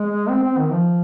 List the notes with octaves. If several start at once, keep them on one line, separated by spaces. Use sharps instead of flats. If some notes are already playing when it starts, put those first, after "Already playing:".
Already playing: G#3
C4
C4
D#3
F3